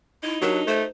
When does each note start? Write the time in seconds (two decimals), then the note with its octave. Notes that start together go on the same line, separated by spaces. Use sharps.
0.23 D#4 E4
0.42 F#3 D4 F#4 G4 A#4
0.67 A3 C5